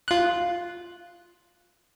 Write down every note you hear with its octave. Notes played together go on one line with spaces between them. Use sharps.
F4 F#6